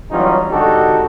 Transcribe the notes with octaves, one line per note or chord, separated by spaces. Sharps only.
E3 F#3 G3 C#4 D#4 F4
G#1 D3 D#4 F#4 G4 A4